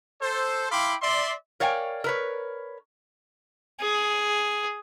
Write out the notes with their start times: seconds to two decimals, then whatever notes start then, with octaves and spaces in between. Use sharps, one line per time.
0.22 A4 C5
0.71 E4 F5 G5 B5 C6 D6
1.02 D5 E5 C6
1.60 A#4 C#5 D5 F5 G5 G#5
2.04 A#4 B4 C#5
3.81 G#4